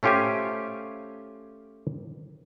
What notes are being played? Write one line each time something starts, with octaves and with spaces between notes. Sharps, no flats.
A3 C#4 F4 G4 C5 G#5